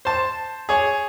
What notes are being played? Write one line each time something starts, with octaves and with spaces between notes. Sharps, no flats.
C5 A5
G#4 C#5